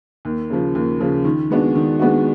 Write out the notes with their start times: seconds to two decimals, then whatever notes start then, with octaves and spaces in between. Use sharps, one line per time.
0.25 D#2
0.50 C#3 F3
0.75 D#2
1.00 C#3 F3
1.24 D#3
1.50 G#3 B3 D4 F#4
1.76 D#3
1.99 G#3 B3 D4 F#4